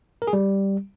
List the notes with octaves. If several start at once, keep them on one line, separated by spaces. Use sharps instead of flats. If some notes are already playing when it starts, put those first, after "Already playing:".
A#4
G#4
G3